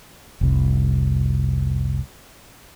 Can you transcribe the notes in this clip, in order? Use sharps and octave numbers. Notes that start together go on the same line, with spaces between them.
F1 C2